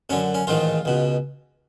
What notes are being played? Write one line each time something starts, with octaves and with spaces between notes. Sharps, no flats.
F#2 D3 C#4
C#4
A1 G#2 D#3 F4
C#2 B2